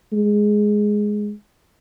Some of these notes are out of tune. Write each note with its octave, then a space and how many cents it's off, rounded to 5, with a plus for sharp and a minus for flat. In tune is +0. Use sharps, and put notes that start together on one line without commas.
G#3 +5